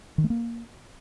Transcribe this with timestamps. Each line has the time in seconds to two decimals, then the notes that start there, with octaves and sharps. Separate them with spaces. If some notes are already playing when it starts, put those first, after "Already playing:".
0.18 D#3
0.24 A3
0.30 A#3